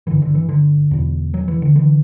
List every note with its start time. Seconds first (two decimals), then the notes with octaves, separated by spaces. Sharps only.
0.07 G2 D3 E3
0.22 D3
0.35 E3
0.49 D3
0.91 E2 B2
1.34 F#3
1.48 E3
1.62 D3
1.76 D3 E3